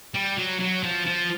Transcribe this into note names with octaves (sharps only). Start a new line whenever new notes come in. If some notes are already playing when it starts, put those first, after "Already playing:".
G3
F#3
F#3
F3
F3